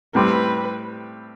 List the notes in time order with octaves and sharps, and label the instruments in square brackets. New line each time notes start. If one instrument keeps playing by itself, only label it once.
[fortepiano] A2 G3 C4 G4 [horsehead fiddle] B4